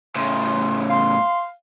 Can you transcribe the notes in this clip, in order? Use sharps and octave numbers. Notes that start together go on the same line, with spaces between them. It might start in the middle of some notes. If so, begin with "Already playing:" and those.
A2 C#3 C6
F5 C6